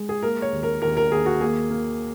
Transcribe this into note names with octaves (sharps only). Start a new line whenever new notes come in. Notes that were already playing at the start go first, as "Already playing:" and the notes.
Already playing: G#3
G#4
A#3 A#4
C#5
D#2
A#4
D#2 A#4
A#4
D#2 G#4
F#4
A#3 G#4
A#3